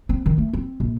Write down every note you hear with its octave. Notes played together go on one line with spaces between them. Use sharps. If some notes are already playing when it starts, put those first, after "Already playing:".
C4
D#3
A3
C4
A#1